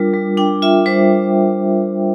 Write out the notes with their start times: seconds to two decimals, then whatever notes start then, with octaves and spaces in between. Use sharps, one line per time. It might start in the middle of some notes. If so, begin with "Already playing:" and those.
Already playing: G3 D4 F4 A#4
0.14 G3
0.37 D4 G5
0.62 F4 E5
0.86 G3 C5